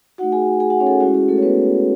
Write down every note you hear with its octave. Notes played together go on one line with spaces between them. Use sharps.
A3 D#4 F#4 F#5
G#4 G#5
G#4 G#5
F#4 F#5
C#4 C#5
A4
G#4
G#3 C#4 E4 F#4
G#4
A3 A4
C#5
B3 B4